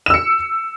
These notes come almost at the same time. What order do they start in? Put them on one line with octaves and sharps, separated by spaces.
E7 E6 C#7